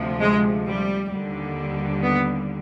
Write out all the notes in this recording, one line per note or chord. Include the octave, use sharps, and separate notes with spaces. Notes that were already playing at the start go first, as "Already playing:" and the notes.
Already playing: D2 C3 F3
G#3
G3
D#2 D3 G3
B3